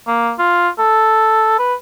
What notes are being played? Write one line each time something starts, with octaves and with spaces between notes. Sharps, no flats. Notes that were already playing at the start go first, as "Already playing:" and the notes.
A#3
F4
A4
B4